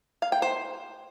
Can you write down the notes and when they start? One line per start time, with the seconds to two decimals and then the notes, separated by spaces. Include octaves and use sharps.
0.22 F5
0.32 G5
0.42 C5